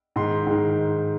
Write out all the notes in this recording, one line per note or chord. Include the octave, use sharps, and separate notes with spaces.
G#2 D#3 C6
G#2 D#3